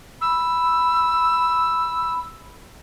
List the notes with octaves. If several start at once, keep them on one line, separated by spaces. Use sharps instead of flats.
B5 E6